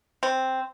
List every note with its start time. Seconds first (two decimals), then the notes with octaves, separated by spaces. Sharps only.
0.23 C4